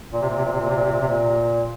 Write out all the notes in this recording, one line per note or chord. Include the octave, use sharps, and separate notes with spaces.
A#2
C3
A#2
C3
A#2
C3
A#2
C3
A#2
C3
A#2
C3
A#2